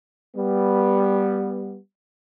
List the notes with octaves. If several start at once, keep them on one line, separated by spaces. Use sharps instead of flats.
G3 B3